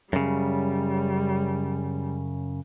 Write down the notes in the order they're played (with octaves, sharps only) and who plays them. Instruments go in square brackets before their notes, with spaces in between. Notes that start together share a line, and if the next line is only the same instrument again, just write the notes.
[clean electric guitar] F#2 C#3 [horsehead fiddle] G3